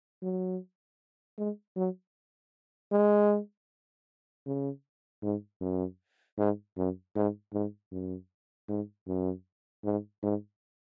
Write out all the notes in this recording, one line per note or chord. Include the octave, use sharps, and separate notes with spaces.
F#3
G#3
F#3
G#3
C#3
G#2
F#2
G#2
F#2
G#2
G#2
F#2
G#2
F#2
G#2
G#2